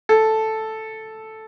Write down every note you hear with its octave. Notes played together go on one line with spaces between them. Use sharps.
A4